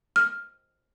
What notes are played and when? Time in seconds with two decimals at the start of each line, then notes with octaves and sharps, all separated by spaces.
0.16 F6